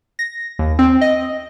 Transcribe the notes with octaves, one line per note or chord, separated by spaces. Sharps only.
A#6
D#2
C4
D#5